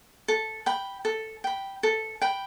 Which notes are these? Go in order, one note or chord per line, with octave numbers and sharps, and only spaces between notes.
A4
G5 B5
A4
G5 B5
A4
G5 B5